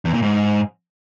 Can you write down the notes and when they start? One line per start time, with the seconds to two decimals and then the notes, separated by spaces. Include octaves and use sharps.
0.05 E2
0.14 A#2
0.22 G#2